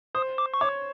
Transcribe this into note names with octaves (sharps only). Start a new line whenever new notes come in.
C5 D#6
D6
C#6
C#5 D6